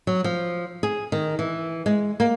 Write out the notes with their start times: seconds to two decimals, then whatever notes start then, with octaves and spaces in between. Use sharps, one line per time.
0.07 F#3
0.24 F3
0.83 G#4
1.12 D#3
1.39 E3
1.86 G#3
2.20 A#3